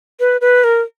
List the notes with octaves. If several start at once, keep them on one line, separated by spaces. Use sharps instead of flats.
B4
B4
A#4